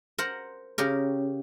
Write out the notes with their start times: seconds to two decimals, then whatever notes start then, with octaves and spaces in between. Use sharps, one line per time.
0.18 A#4 C5 F#5
0.78 C#3 G4 A#4